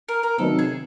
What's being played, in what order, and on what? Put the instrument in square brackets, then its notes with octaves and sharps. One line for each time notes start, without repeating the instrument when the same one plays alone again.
[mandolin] A#4
A#4
[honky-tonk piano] C3 D#3 F#3 B3 D#4 [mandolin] A4
[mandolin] G#4